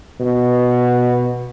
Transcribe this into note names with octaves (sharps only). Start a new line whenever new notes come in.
B2